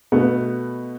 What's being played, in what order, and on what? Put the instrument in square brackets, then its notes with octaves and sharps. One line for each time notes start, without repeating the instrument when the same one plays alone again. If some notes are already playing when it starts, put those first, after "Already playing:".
[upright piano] B2 A3 B3